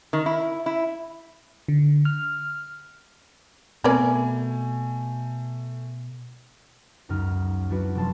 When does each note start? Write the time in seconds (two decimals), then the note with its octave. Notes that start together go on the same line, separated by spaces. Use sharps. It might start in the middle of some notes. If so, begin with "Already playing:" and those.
0.13 D#3
0.26 E4
0.66 E4
1.68 D3
2.05 F6
3.84 B2 A3 B3 C4 A#4 B4 D5 G#5
7.09 C#2 F#2 D#4 F6
7.70 F#3 D4 E4 F#4 B4
7.95 F1 G#3 A5 C6